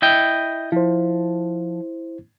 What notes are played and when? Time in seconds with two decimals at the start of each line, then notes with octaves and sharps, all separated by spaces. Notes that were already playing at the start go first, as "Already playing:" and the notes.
0.02 E4 D#5 G5
0.72 F3 E4 C5